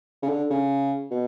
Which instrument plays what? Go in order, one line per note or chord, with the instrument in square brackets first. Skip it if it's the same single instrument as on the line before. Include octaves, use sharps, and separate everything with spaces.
[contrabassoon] C#3
D3
C#3
B2